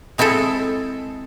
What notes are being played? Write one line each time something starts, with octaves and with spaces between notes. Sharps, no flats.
G#3 C4 E4 G#4 A4